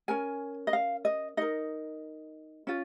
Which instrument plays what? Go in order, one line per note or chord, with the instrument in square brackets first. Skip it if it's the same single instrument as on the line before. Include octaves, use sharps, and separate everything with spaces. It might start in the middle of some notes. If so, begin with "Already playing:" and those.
[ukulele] C#4 A#4 G#5
D#5
F5
D#5
D#4 A#4 D#5
C#4 F4